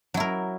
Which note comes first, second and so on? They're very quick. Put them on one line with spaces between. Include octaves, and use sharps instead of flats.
F#3 E4 A#4